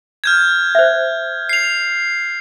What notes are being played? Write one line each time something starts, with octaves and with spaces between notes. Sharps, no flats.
F6 G6 G#6
C5 E5
C7 F7